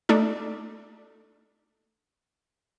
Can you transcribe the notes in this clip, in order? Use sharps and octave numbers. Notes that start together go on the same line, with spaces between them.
A3 D4 D#4 A4